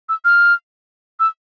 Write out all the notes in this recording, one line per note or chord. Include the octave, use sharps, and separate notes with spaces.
E6
F6
E6